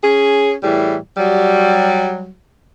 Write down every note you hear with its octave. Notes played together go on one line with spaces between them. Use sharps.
C#4 G#4
A2 E3 G3 G#4
F#3 G3